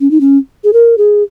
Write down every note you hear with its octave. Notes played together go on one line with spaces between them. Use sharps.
C#4
D#4
C#4
G#4
A#4
G#4